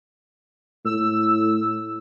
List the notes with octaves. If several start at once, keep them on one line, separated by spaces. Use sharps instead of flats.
A2 E6